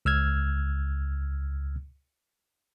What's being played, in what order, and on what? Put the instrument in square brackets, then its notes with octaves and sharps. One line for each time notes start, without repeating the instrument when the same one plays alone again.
[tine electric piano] C#2 E6 F6 G#6